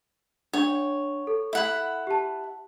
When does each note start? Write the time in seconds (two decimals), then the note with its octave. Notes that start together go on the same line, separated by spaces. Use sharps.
0.53 D4 C#5 F#5
1.27 A4
1.53 E4 F#5 B5
2.07 G4 A5